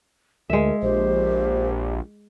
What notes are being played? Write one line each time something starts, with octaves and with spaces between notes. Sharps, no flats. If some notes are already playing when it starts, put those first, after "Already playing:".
D2 G#3 A#4 E5
A#1 G4 C5